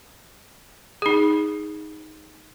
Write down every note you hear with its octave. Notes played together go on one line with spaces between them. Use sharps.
D#4 G#4